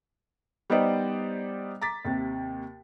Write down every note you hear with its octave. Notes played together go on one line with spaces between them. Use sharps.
G3 B3 D#4 C5 D5 D#5
A#5 D6 A6 B6
D#2 C3